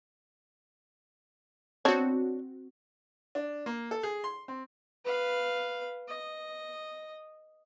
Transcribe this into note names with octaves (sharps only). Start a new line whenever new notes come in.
B3 C4 D4 F#4 C#5
D4
A#3
A4
G#4
C6
C4
B4 F5
D#5